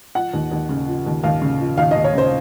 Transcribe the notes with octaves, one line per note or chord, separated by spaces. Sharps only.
F3 F#5
D#2
D#2
C#3
F3
D#2
D#2 F5
C#3
F3
D#2 F5
D#2 D#5
C#5
C#3 C5